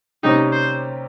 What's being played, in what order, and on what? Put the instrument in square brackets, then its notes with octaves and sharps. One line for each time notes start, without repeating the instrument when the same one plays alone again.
[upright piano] C3 G3 A#3 C#4 G4 [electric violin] D#4
[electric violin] C5